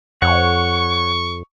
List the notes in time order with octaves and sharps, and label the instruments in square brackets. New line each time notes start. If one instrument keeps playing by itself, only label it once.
[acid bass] F2 [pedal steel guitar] C#5 F#5 [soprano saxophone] C#6